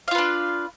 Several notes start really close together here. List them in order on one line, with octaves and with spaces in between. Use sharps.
F5 F4 B4 D4